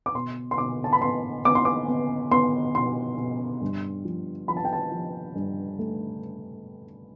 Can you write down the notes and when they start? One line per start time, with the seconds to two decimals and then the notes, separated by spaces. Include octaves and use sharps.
0.06 D6
0.15 B2 C6
0.51 C6
0.58 B2 D6
0.84 A5
0.93 B5
1.01 B3 C6
1.45 B3 D6
1.55 C6
1.65 D6
1.88 B3
2.31 B3 C6
2.75 B2 C6
3.18 B2
3.61 G2
4.05 F3
4.48 F3 B5
4.57 A5
4.65 G5
4.73 A5
4.91 F3
5.35 G2
5.79 A3